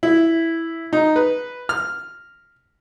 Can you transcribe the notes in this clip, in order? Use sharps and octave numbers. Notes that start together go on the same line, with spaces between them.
E4
D#4
B4
F6